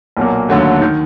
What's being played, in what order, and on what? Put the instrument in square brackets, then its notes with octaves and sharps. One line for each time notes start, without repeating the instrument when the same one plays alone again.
[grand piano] B1 A#2 F#3 A#3
D#2 D3 F#3 A3
D#3